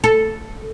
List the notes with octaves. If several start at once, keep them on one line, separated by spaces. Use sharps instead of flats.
A4